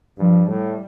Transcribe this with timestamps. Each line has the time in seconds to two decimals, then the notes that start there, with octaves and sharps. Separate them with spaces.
0.18 G2 F3
0.47 A2 G3